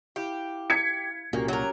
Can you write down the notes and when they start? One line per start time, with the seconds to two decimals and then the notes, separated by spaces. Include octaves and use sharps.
0.16 E4 G4 F5
0.70 G#6 B6 C#7
1.33 C2 A#2 A#3 C#4 F#4 G4
1.48 F#3 A#4 C#5